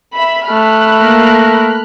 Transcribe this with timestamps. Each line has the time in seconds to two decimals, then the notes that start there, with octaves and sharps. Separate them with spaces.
0.14 E5 B5
0.50 A3 B5 F6 F#6
1.00 A#3 A#4